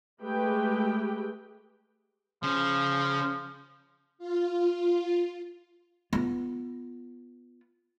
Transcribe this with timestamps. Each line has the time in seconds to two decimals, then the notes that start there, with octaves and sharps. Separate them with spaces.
0.23 G#3 A3 G4 G#4 B4 G5
2.43 C#3 F3
4.18 F4
6.13 B3 F4